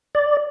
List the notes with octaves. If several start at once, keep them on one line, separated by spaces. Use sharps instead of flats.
D5